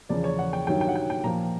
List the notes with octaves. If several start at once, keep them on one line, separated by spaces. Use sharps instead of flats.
E2 C#3 F3 D5
C#5
F#5
G5
G2 D#3 F#3 G5
G5
F#5
G5
G5
A#2 F3 A#5